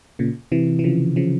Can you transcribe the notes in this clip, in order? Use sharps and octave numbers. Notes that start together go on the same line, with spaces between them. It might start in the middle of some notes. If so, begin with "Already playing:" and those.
A#2 C#3
C3 E3
E3
C#3 F3
C#3 F3